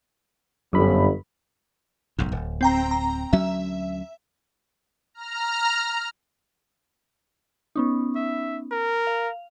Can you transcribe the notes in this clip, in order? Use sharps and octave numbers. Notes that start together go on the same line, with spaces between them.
G1 F#2 B5
F1 B1 G#2
D1
C4 G5 A#5
A#5
D2 F#3 C#4 E5
A#5 F6
B3 C#4 D#4
E5
A#4
F5